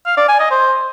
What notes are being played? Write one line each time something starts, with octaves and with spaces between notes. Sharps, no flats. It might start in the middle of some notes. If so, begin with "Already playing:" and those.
F5
D5
G#5
D#5
C5